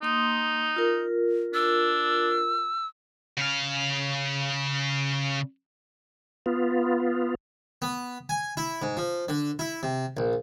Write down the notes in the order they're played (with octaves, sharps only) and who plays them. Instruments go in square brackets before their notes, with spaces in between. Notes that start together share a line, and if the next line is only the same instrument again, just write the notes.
[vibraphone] A#3 C6 D#6 [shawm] D#4
[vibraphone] F4 A#4
[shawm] D4 [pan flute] E6
[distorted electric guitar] C#3 F5
[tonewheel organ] B3 F4
[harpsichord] B3
G#5
E4
G#2
F3
D3
E4
C3
A#1